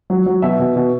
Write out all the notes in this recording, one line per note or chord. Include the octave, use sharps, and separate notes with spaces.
F#3
F#3
B2 E5
B2
B2